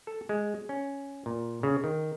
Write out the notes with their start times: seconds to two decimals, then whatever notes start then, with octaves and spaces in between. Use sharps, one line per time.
0.07 A4
0.29 G#3
0.69 C#4
1.26 A#2
1.63 C#3
1.84 D#3